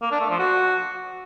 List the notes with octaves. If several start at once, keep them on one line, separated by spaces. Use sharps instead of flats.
A#3
D4
A3
F3
F#4